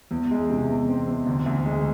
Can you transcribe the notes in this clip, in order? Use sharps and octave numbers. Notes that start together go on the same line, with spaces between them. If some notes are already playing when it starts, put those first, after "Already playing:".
E2
G#3
C3
E2
C4
E2
D2
D2
G#3